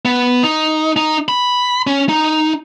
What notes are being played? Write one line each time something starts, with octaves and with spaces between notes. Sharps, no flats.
B3
D#4
D#4
B5
C#4
D#4